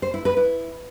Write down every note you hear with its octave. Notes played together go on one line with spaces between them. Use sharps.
C5
E4
B4
E4